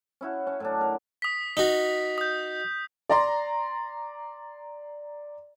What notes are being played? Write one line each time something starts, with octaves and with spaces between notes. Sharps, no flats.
C#4 E4 F#4
C#4
A2 F#3 D4
A#4
D#6 B6
D#4 F#4
D#6 G6
D5 A#5 C6